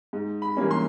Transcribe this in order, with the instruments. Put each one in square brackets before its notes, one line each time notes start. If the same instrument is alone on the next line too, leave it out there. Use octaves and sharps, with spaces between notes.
[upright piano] G#2
B5
E3 G3 A#3 C#4
C6